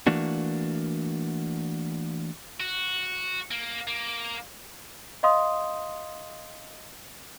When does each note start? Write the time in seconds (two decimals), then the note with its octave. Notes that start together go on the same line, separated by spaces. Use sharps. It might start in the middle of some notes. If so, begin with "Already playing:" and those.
0.07 E3 A3 A#3 D4 F#4
2.60 F#4
3.51 A#3
3.87 A#3
5.23 D#5 F5 C6 D#6